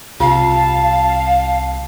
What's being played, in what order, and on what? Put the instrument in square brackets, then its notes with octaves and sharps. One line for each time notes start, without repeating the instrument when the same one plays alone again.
[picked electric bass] C2 C3 [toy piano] F4 [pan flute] F5 [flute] A5